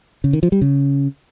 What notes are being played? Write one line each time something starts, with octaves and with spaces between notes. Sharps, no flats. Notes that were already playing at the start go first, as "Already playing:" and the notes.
C#3
D#3
F3
G3
C#3